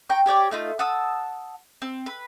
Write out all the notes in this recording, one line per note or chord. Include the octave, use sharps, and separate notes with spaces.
G5 A#5 C#6
G4 C#5 D5 G5
A3 D#4 F4
F#5 A5 D#6 E6
C4
B4